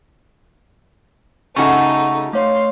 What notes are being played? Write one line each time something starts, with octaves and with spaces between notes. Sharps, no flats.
C#3 A3 D#4 F#4 A4 C#6
A3 C#5 F5 C6